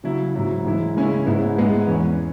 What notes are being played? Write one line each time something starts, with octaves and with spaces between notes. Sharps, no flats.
C#3 F#3 E4
G#2 F#3 E4
G#2 E3 G#3 E4
C#3 G#3 C#4 E4
G#2 G#3 B3 E4
G#2 G#3 B3 E4
E2 E3 C#4